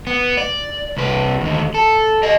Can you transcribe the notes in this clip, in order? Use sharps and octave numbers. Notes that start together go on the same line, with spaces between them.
B3
D5
C2 B4
D#2 D3
A4
G4 D#5